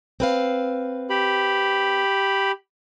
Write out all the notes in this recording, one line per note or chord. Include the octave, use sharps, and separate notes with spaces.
C4 B4 F5
G4 B5